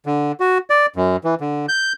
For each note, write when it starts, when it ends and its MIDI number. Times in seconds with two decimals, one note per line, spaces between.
0.06 0.32 50
0.40 0.58 66
0.70 0.86 74
0.96 1.17 42
1.24 1.35 52
1.40 1.66 50
1.69 1.93 91